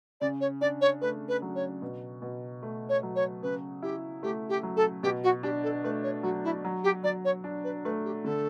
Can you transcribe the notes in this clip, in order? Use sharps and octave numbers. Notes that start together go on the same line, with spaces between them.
C#3 D5
C#5
D4 D5
C#5
A3 B4
B4
F#3
C#5
B2
B2
A3
C#5
F#3
C#5
C#3 B4
E4 G4
A3 G4
G4
F#3
A4
B2 G4
F#4
D4 G4
A4
A3 B4
C#5
F#3 F#4
E4
F#3
G4
F#3 D5
C#5
D4
B4
A3 B4
G4
D3 A4